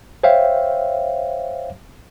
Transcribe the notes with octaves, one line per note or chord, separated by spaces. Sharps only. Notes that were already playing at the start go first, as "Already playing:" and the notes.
C5 C#5 E5 F5 G5